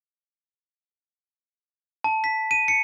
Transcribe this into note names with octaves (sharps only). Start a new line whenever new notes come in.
A5
B6
D#7
C#7